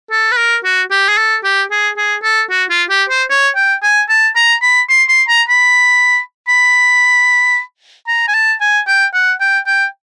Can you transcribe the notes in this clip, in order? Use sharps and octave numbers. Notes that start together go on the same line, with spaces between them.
A4
B4
A#4
F#4
G4
G#4
A4
G4
G#4
G#4
A4
F#4
F4
G4
C5
C#5
G5
G#5
A5
A#5
B5
C6
C6
A#5
B5
B5
A#5
G#5
A5
G#5
G5
F#5
G5
G5